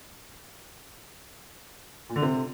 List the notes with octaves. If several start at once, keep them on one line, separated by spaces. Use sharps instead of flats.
A#2
D3
C3